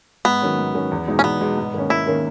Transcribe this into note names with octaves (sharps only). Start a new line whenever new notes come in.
G#2 B3
D#3 F#3 C#4
G#2
D#3 F#3 C#4
E2
B2 G#3 D#4
C#4
E2 B3
B2 G#3 D#4
G#2
D#3 A#3 C#4
G#2 E4
D#3 A#3 C#4